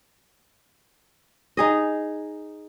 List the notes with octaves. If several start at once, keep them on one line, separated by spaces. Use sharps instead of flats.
D#4 G#4 D#5